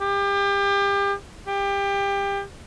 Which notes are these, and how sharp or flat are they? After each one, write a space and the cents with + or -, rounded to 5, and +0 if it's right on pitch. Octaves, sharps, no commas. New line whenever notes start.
G4 +30
G4 +25